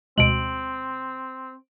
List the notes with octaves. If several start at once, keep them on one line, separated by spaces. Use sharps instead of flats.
D2 B2 G#3 C4 D7 F#7